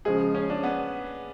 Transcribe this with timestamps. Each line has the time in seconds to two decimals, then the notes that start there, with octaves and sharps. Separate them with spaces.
0.05 C#3 F3 G#3 G#4
0.35 C#4
0.50 D4
0.63 B3